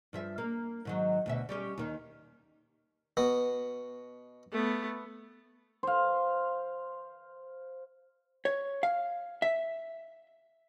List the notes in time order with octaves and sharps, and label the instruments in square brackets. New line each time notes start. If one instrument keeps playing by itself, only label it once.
[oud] G2 F3 E5
A#3
G#2 D#3 F#3
D2 B2 E5
G3 C#4 G4
D#2 D#3
[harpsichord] B2 B3
[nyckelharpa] A3 B3
[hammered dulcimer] C5 F5
[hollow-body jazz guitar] C#5
F5
E5